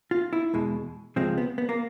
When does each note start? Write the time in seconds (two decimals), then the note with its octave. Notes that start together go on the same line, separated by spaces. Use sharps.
0.11 F4
0.33 E4
0.53 E2 B2 G#3
1.16 C#2 C3 F3 G#3 C4
1.38 B3
1.58 B3
1.69 A#3